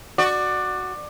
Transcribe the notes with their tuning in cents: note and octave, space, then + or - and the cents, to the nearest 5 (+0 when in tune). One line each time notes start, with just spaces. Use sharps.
F#4 +0 D5 +20